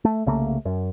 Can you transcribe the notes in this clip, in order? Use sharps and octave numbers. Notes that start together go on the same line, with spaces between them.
A3
C2 C#3 A3 A#3
F#2